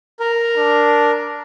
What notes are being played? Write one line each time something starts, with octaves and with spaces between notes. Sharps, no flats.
A#4
D4